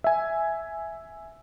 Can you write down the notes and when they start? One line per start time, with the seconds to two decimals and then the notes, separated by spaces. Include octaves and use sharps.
0.04 E5 G#5